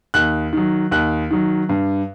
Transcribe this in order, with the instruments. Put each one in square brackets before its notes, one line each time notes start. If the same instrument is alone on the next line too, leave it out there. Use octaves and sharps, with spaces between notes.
[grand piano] D#2 F#6
D#3 F#3
D#2 F#6
D#3 F#3
G2